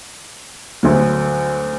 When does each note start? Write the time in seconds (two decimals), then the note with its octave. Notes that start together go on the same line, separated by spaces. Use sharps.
0.83 D2 D3 F#3